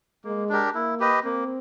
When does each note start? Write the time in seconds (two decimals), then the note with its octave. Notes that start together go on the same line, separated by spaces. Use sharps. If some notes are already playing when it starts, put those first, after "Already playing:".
0.24 G#3 A#3
0.49 D4 G4 A#4
0.74 A#3 E4
1.00 G4 B4 D#5
1.24 A#3 C4